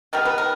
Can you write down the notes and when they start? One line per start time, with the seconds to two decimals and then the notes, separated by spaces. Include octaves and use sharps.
0.13 D#3 G3 B3 A#4
0.25 B4
0.38 A#4